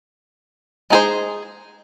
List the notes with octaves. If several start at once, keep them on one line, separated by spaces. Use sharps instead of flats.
G#3 D#4 G#4 C5